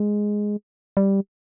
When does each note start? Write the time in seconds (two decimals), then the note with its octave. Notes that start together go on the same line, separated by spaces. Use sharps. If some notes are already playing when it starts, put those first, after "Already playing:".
Already playing: G#3
0.97 G3